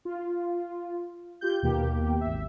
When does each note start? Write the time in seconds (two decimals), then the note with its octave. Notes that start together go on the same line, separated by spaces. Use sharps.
0.05 F4
1.41 F4 G4 G6
1.62 D#2 B2 A#3 G4
2.21 G#1 E5